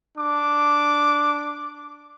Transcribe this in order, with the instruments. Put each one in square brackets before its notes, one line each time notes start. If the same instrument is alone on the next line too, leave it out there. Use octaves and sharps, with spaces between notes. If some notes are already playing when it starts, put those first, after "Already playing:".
[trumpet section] D4 D6